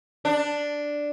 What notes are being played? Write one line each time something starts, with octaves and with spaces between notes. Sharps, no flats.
D4